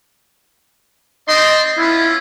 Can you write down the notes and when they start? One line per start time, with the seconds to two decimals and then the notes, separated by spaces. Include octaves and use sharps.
1.28 C4 D5 D#5 C6
1.78 B3 C#4 E4 F4